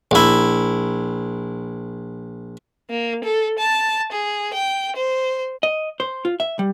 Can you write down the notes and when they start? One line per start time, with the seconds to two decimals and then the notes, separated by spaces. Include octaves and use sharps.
0.11 A#1 E4
2.90 A#3
3.24 A4
3.59 A5
4.12 G#4
4.54 G5
4.96 C5
5.63 D#5
6.00 C5
6.25 F4
6.40 E5
6.59 G3